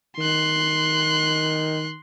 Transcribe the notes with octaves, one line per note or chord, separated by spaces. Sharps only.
D#3 C6 F#6